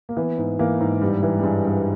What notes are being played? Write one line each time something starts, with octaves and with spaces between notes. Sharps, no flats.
A#3
E3 B3
G#2
E3 A#3
G#2
G2 G3
E3
G3
G2 G#3
G2